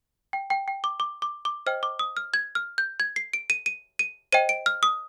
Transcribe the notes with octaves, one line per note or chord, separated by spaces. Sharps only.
G5
G5
G5
D6
D6
D6
D6
C5 D#5 G5 F6
D6
D#6
F6
G#6
F6
G6
G#6
C7
D7
D#7
D#7
D#7
C5 D#5 G5 D#7
D7
F6
D#6